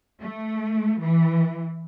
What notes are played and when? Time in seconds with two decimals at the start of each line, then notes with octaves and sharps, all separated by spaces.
0.21 A3
1.00 E3